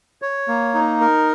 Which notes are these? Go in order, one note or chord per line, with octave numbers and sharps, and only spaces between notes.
C#5
A#3
D#4
A#4